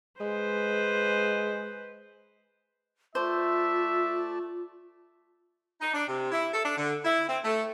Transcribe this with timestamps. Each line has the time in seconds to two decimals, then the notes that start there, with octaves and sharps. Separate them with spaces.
0.21 G#3 B4 C5
3.15 A3 F4 C5 D5 E5 A5
5.81 D#4
5.93 D4
6.08 C3
6.32 E4
6.53 A4
6.65 D4
6.77 D3
7.04 E4
7.29 C4
7.44 A3